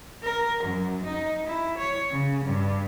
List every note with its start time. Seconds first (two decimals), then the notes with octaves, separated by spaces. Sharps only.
0.23 A#4
0.63 F#2
1.05 D#4
1.46 E4
1.77 C#5
2.11 C#3
2.45 G2